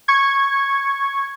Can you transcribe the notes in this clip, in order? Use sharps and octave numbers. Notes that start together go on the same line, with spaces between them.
C#6 G#6